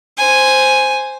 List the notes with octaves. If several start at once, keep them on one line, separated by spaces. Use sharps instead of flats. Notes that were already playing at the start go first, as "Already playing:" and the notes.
C5 G#5